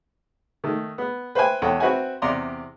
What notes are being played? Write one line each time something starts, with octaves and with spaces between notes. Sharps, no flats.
D#3 A3
B3
B4 C5 E5 G5 G#5
E2 A4 C#5 F#5 G5
C4 F#4 B4 E5 F#5 G#5
E2 C3 D5 A#5 C6 D6